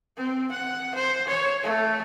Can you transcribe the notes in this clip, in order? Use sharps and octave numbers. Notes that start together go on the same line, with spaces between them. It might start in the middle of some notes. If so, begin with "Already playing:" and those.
C4
F#5
C5
C#5
A3